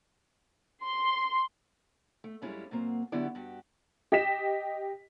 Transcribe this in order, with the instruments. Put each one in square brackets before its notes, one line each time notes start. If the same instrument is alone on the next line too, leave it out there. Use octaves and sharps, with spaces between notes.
[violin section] C6
[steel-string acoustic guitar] A3
F#2 G3 G#3 C#4 E4 F4
A#2 F#3 A#3 C4
D3 F#3 B3 E4 G4 D5
G2 F#4 G4
[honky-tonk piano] G4 D#5 B6 E7